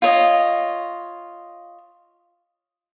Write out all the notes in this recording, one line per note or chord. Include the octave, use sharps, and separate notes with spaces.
F4 C#5 D#5